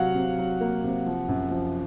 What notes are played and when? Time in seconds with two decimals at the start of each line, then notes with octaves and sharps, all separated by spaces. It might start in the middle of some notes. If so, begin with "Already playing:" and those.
Already playing: C3 F#3 F5 F#5
0.15 C3
0.38 F#3
0.61 A#3
0.83 C3
1.06 F3
1.28 F#2
1.50 F3